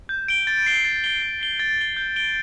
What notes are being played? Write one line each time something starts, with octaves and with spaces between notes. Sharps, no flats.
G6
D7 G7
A6
C7 G7
A6
C7 G7
A6
C7 G7
A6
C7 G7
G6
D7 G7